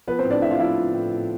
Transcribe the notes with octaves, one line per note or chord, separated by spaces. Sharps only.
F3 B3 B4
C4 C5
A2
D4 D5
A2 E4 E5
F4 F5
F3 E4 E5
F3
A2
A2